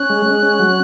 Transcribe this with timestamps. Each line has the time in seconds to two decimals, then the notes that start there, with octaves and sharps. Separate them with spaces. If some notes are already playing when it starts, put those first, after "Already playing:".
Already playing: C#4 F#6
0.10 G#3
0.26 G#3
0.43 C#4
0.59 F#3